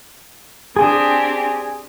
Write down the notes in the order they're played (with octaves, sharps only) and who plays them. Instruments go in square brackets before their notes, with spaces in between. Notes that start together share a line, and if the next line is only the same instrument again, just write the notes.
[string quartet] C4 D4 G4 [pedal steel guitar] G#4 G#5 D#6